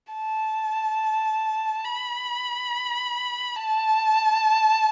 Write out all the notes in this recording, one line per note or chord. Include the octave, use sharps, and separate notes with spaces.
A5
B5
A5